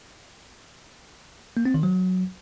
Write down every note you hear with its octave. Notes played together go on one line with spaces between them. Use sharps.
A#3
C4
D#3
F#3